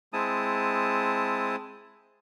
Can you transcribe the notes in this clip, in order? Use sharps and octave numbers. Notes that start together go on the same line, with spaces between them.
G#3 C4 E4 A5 D#6